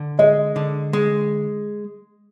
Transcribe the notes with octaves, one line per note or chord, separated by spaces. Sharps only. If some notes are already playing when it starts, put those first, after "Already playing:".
Already playing: D3
G#3 D#5
D3
G#3